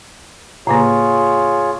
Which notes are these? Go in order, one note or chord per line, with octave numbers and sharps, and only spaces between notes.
A2 C#3 A#3 F4 G#4 C#5